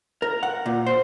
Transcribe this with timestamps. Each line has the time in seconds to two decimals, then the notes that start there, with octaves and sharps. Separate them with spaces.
0.22 A#4
0.43 F#5
0.66 A#2
0.86 C5